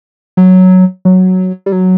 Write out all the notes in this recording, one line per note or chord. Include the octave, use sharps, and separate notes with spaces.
F#3
F#3
G3
F#3